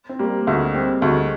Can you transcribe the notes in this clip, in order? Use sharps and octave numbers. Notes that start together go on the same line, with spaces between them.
C4
G3 A#3
A#3
D2 G#3
G3 C4
D2 G#3